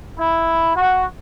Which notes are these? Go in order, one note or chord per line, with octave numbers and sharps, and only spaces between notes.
E4
F#4